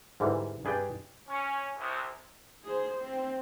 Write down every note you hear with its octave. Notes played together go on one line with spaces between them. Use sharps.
G#2 D3 E3 G3
G2 G#4 B4 D5 G5
C#4
C2
G#4 C5
C4